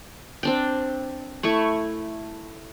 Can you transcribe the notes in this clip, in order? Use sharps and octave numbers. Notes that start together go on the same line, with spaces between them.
C4 D4 G5
A3 E4 C#6